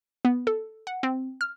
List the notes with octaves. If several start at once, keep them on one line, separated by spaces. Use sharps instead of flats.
B3
A4
F#5
C4
F6